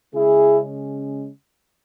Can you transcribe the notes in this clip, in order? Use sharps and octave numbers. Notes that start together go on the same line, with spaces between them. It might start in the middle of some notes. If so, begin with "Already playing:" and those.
C#3 G#3 C#4 E4 G#4